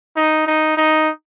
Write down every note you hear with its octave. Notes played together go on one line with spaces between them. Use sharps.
D#4
D#4
D#4